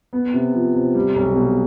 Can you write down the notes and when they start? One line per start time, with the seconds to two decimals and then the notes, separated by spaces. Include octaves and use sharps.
0.13 B3
0.34 C3
0.55 F3
0.75 C3
0.95 G3
1.15 B1
1.36 B2